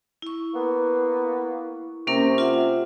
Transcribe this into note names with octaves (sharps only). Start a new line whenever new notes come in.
E4 C#6
A#3 B3
C3 A#3 C#4 A#4
F4 E5 F#5